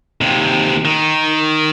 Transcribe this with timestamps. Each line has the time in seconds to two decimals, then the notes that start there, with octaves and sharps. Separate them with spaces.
0.21 D#2 C3
0.85 D#3